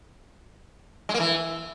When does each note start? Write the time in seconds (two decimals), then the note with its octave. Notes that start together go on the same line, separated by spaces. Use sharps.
1.09 G#3
1.14 A#3
1.20 E3